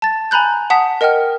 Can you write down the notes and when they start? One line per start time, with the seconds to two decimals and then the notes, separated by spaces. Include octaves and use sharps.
0.02 A5 A6
0.31 G#5 A#5 B5 F#6 G6
0.70 F#5 A5 D#6 B6
1.01 A#4 D#5 F#5 G5 F6